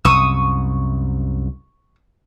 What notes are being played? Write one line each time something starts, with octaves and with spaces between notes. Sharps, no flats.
C2 F#2 C3 C#6 D#6 E6